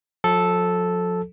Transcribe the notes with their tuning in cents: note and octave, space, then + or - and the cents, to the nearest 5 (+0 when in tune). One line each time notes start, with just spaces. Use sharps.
F3 +40 A4 -5